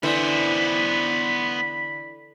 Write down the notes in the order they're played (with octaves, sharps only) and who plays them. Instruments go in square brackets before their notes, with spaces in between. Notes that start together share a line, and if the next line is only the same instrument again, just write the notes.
[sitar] D3 [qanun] E3 [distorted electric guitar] B3 C5 [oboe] B5